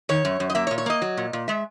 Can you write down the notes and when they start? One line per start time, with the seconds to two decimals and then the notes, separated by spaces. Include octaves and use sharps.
0.09 D#3 C#5
0.25 F#2
0.40 F#2
0.50 D#5
0.55 A#3 E5
0.67 C#5
0.71 A#2
0.78 C#5
0.86 A#3 D#5
1.02 F#3
1.17 A#2
1.33 A#2
1.48 G#3 E5